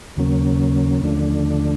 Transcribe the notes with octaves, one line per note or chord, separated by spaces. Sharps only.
D#2 C#3 F#3 A#3 C#4
D#2 D3 F3 A3 D4